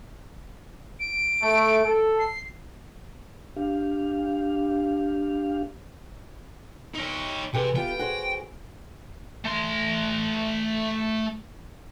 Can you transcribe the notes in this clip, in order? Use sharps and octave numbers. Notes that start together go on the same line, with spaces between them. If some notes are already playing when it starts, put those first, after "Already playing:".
D7
A3
A4
C7
D4 G4 F5
D#4 C#5
C3 G4 G#4 B4
B3 F4 G4 G5
F#4 G#4 C5
A3 C6